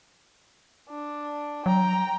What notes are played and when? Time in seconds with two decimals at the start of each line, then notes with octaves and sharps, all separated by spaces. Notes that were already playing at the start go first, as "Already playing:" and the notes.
0.89 D4
1.66 F#3 G5 A#5